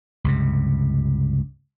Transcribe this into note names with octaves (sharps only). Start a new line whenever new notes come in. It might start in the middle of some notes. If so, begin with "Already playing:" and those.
C#2 G2 C3